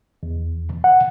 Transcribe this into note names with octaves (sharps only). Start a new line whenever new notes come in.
E2
F#5